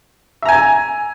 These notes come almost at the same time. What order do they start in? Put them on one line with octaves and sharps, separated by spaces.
E5 A#5 G#5